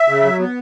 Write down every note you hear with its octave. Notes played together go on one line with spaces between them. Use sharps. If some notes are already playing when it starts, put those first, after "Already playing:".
Already playing: E5
C#3
F#3
B3